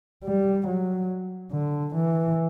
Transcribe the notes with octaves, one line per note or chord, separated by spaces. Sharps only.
G3
F#3
D3
E3